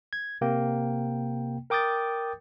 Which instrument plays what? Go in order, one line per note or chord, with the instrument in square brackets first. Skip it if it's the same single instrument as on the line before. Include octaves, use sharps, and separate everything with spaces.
[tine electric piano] G#6
C3 A#3 G5
A#4 G5 D6 D#6 G6 A6